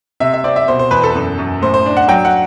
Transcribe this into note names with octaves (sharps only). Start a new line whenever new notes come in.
C3 E5
E5
C4 D5
E5
B2 C5
C5
E2 B4
A4
F#2
F#2
A2 C5
C5
D4
F#5
F#3 G5
F#5